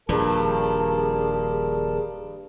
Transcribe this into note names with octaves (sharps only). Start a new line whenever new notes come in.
D#1 G2 F3 G#4 A#4 A5